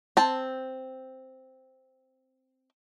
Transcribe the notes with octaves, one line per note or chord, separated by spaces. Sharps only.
C4 A5